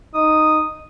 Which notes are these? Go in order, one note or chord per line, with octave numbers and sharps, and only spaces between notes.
D#4 D#6